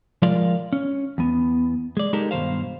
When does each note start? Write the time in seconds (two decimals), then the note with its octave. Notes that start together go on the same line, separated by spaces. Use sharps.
0.22 F3 G#3 F4 A#4 D5 F5
0.73 C#4
1.18 E2 B3
1.97 G#3 D5
2.13 G#3 D#4 G4 A4 A#4
2.31 G2 B2 D#3 C5 F5